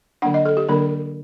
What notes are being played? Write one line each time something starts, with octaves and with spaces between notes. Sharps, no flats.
D3 F#3 A#3 D4 F#5
D#5
A4
G4
D3 F#3 A#3 D4 A#4